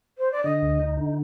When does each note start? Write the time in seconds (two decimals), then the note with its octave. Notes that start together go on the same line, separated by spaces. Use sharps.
0.18 C5
0.32 D5
0.44 D3 D#5
0.62 D2
0.80 D#4
0.97 D3